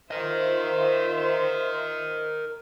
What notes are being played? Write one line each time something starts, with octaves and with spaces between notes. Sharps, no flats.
F4 A#4 C5 D#5 E5